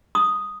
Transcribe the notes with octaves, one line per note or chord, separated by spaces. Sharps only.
D#6